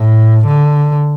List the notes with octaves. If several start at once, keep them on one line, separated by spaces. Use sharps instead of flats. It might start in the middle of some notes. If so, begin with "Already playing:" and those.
Already playing: A2
D3